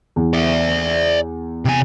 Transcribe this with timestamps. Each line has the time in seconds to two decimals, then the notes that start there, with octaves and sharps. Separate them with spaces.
0.16 E2
0.33 D5 E5
1.65 C3 G#5